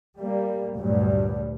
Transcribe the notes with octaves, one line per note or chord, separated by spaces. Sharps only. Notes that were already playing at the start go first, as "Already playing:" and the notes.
G3 A#3
D2 G2 A#2 F#3 G3